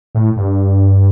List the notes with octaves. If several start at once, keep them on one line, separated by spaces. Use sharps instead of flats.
A2
G2